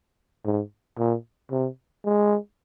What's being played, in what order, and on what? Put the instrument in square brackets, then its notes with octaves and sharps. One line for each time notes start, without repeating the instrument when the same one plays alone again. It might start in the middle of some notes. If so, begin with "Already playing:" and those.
[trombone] G#2
A#2
C3
G#3